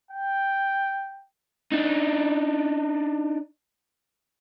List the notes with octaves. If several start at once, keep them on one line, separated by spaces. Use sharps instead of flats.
G5
D4 D#4